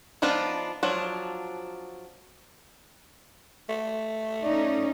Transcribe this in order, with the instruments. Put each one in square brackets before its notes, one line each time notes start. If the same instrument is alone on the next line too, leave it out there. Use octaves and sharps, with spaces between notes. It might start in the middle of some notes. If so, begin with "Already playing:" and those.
[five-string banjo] F3 B3 D4 D#4 F4
F3 F#3 D4
[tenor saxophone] A3
[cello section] C#4 D#4 [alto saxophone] D5